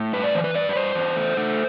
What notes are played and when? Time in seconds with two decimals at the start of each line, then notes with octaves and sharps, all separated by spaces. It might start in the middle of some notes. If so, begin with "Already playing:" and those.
Already playing: A2
0.13 G2 B4
0.24 D5
0.35 E3 C5
0.44 B4
0.54 G2 D5
0.69 B4
0.76 G2 C5
0.95 E2
1.16 A3
1.37 A3